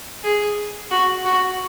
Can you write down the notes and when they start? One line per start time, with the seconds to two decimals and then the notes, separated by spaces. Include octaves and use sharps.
0.23 G#4
0.91 F#4
1.24 F#4